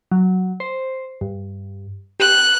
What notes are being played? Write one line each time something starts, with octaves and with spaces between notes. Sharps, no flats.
F#3
C5
G2
G4 F#6